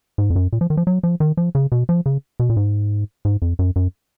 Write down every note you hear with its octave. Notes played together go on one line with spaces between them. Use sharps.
G#2
F2
F#2
A#2
F3
D#3
F3
F#3
F3
D#3
F3
C#3
B2
F3
C#3
B2
A#2
G#2
G#2
F2
F#2
F#2